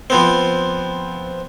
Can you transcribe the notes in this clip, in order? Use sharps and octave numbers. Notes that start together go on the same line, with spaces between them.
F3 B3 C4